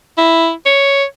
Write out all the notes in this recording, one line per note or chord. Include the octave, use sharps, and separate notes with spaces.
E4
C#5